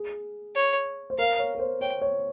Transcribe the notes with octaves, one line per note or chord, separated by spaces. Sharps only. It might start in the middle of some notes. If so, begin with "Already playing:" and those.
Already playing: G#4
C#5
C5
A#4 F5
C#5
A#4
C5
C#5 G5
C#5